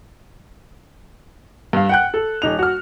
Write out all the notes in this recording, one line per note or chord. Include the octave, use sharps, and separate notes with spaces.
G2 F5
F#5 G5 F#6
A4
D#1 D#4 F7
F#4 F6